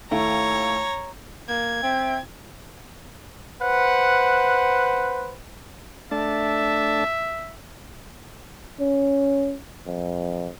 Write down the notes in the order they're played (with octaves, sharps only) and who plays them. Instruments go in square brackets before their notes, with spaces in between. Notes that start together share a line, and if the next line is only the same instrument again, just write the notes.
[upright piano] D#2 A3 E4 [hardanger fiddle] C#5 A#5
[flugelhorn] A#3 [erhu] G#6
[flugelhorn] C4 [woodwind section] E5 G5
[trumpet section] B4 C5 F#5
[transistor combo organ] A3 D4 A5 [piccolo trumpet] E5
[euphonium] C#4
F2